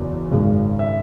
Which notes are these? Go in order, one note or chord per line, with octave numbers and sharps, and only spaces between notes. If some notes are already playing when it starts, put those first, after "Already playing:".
Already playing: F#1 E2 F#3
G#1 F#2 C#3 G#3
E5